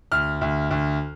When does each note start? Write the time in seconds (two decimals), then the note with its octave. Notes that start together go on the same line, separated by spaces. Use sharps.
0.12 D2 F6
0.41 D2
0.71 D2